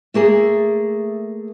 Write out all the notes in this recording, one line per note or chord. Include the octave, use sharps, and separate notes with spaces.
A3 A#3 G#4 A4